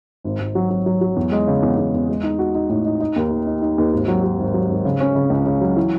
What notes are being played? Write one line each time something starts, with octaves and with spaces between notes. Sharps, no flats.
G#1
G#1
F#3
F#3
F#3
F#3
E2
G#3
C#3
E2
E2
E2
G#3
D#4
F#4
D#4
A2
D#4
D#4
D#2
D#3
D#4
D#4
D#2
G#1
F#3
F#3
G#1
F#3
G#1
C#3
C#4
C#3
C#2
C#3
F#3
E3